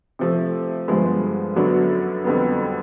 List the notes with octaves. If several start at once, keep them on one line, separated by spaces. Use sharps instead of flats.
C3 F3 A3
G2 D3 F3 G#3 B3
F#2 D3 F#3 B3 D4
F2 D3 G3 B3